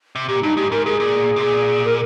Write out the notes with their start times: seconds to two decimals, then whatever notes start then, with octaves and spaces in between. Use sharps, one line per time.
0.16 C3
0.28 A#2 G4
0.43 G2 D#4
0.57 G#2 G4
0.71 G#2 A#4
0.85 G#2 G#4
1.00 A#2
1.36 C3
1.41 A#2 G#4
1.85 A#4